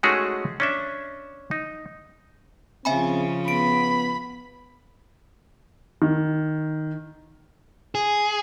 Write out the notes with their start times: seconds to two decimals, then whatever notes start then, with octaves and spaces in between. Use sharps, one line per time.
0.03 G#3 A3 C#4 D#4 F#4 G#4
0.60 C#4 D4 E5
1.51 D#4
2.85 C#3 F3 C4 E5 G#5 B5
3.48 B3 B5 D7
6.02 D#3
7.95 G#4